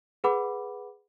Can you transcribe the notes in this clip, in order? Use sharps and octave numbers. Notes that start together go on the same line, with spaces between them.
G#4 B4 F#5 B5 D6